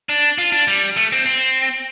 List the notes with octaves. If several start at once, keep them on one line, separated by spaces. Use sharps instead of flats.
D4
F4
D4
G3
A3
C4
C4